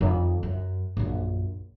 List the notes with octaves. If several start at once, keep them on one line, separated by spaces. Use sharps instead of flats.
F2 D#3
F#2
A#1 F#2